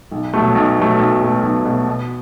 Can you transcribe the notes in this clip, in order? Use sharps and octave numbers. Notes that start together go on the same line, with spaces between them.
B1
B2 F#3 A3
B1
B2 F#3 A3
B1
B2 F#3 A3
B1
B2 F#3 A3
B2